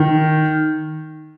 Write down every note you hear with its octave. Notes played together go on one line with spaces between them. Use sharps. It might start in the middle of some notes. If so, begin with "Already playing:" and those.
Already playing: D#3